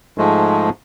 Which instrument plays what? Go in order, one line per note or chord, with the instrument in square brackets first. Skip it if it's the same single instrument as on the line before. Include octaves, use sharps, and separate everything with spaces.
[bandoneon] G#2 F3 G#3 A3